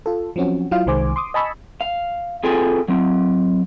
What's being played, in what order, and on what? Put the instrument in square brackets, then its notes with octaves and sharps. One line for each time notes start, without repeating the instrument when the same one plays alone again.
[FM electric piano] F4 A4
F3 F#3 C4 C#4 F#4
F#3 E4 F4 F5
C2 D#3 G#3 C5 G#5 D6
C6 D6 D#6
D#5 G#5 A5 B5 C#6 E6
[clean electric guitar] F5
C4 F4 G#4 A4 G5 G#5
F#3 C4